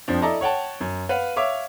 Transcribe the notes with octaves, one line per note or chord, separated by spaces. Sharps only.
F2 F3 C4 D4
E4 A4 D5 D#5 A5 A#5
C#5 F#5 G5 A5
F#2
B4 F5 F#5
C#5 E5 F5 D6